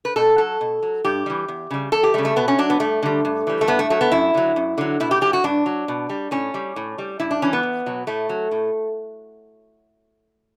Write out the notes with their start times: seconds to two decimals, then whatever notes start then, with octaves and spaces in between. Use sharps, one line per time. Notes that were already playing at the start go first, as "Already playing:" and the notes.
0.05 B4
0.16 B2 A4
0.38 F#3 A4
0.61 B2
0.83 F#3
1.04 G2 G4
1.26 E3 G3
1.48 E2
1.71 C#3 G3
1.92 E2 A4
2.03 G4
2.14 C#3 G3 A3
2.25 A3
2.36 B2 B3
2.48 C#4
2.58 F#3 D4
2.70 B3
2.80 G2 A3
3.03 D3 G3
3.25 G2
3.47 E3 G3
3.61 A3
3.68 G2 B3
3.79 A3
3.90 F#3 A3
4.01 B3
4.12 F#2 E4
4.34 D3 F#3
4.56 F#2
4.78 D3 F#3
5.00 B2 E4
5.11 G4
5.21 F#3 G4
5.33 F#4
5.44 G2 D4
5.66 F#3
5.88 B2
6.09 G3
6.31 A2 C#4
6.54 G3
6.76 A2
6.98 G3
7.20 G2 E4
7.31 D4
7.42 E3 G3 C#4
7.53 B3
7.63 E2
7.86 B2 F#3
8.07 A2 A3
8.29 F#3
8.51 A2